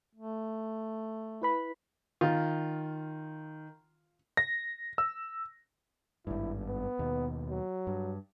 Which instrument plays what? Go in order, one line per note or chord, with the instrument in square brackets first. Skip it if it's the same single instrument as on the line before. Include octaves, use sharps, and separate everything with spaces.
[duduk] A3
[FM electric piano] E4 B4 B5
[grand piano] D#3 [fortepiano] F4
[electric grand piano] A#6
E6
[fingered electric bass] G#1 G2 [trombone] E4
[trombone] B3
[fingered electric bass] D#2 B2
[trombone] F#3
[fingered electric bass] G2